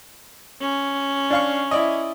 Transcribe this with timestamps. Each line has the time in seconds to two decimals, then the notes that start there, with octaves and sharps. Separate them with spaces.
0.61 C#4
1.30 D4 F5 C#6
1.71 E4 D5 D#5